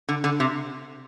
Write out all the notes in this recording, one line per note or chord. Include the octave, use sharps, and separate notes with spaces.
D3
D3
C3